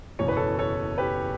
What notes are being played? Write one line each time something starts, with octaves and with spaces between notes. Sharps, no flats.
F#1 E2 B2 C#5
B4
A4 C#5
A4 C#5
G4 B4